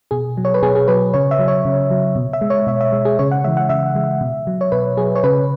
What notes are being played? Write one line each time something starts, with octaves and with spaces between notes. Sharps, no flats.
B2 G#4
F#3
C#5
B4
B2 G#4
G#4
F#3 B4
C#3 C#5
E5
F#3
C#5
C#3
F#3
B2
E5
G#3
C#5
B2 E5
E5
G#3
G#4
C#3 C#5
F#5
E3 G#3 E5
F#5
C#3 E5
E3 G#3
B2
F#3
C#5
B2 B4
F#3 G#4
C#5
C#3 B4